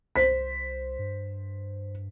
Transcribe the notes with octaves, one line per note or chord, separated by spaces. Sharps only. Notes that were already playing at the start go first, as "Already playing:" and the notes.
C2 C5 B6
G2